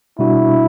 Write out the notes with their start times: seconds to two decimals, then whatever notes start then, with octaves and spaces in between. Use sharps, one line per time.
0.19 B2 G3 D4 E4 F#4